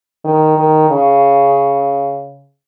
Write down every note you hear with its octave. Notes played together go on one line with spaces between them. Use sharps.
D#3
D#3
C#3